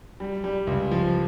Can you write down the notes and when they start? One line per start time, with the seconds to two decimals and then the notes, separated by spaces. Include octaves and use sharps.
0.20 G3
0.44 G3
0.67 C#2
0.91 F3